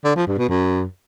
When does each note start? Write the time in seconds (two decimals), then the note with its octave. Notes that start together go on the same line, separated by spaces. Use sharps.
0.05 D3
0.16 F3
0.27 G2
0.38 B2
0.49 F#2